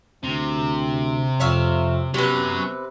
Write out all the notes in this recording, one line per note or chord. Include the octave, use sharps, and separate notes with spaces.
D2 C3
F2 C#5 E5 F5
C3 F#3 B3 C#4 B4